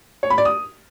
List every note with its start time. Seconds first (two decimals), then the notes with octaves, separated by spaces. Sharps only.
0.23 C#5
0.30 B5
0.38 D5
0.45 D#6